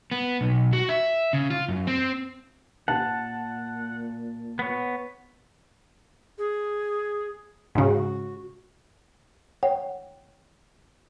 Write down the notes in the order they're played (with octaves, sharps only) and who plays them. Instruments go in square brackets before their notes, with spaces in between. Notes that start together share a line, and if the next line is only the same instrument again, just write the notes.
[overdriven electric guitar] B3
B1
F#4
E5
C#3
F4
F#2
C4
[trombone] A#2 [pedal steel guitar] F#5 [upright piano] A5
[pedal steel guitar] B3 C#5
[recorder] G#4
[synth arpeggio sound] G#2 C#3 [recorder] F#4
[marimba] C#5 F#5 G5